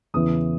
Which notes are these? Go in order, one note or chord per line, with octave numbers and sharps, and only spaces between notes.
E2 C#3 E3 B3 E4 D#6